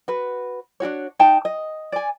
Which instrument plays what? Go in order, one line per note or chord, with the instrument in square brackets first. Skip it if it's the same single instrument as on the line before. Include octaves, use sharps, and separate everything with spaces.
[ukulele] F#4 B4
D4 F4 F#4 C#5
D#4 G5 A5
D#5
D5 G#5